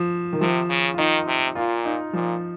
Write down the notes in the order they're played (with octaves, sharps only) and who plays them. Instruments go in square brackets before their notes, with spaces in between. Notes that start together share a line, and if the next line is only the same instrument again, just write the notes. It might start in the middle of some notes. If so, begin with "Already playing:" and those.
Already playing: [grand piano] F3
D#3
[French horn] C3 [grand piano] F3
[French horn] C#3
[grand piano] F4
[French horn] D#3 [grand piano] D#4
[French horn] C3
[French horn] A#2 [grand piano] F4
[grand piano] D#4
[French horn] A#2 [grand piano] F3